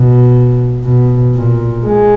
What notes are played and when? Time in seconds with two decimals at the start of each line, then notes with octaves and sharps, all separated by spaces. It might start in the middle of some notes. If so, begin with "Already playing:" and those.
Already playing: B2
0.85 B2
1.36 A#2
1.86 G#3